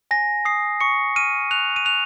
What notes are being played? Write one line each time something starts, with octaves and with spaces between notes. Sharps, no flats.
G#5 A#6
D#6 C7
C#6 C#7
F6 D#7
F#6 F7
D#7
F#6 F7